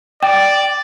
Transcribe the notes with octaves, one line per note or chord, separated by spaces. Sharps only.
D5 G5